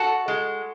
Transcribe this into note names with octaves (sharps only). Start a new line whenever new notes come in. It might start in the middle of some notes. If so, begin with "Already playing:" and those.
Already playing: F#4 A4
G#3